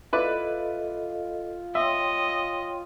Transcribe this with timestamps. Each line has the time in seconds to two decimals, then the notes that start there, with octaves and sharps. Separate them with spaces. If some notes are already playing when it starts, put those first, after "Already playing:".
0.13 E4 F4 A4 B4 D5 D#5
1.75 C#5 D#5 E5 G5 C6